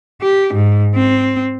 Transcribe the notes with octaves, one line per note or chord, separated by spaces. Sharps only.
G4
G#2
C4